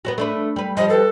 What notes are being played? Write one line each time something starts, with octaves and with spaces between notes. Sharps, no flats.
B3 C#4 F#4
A3 D4 B4
G3 B4
F3 G3 C5 D#5
A4 B4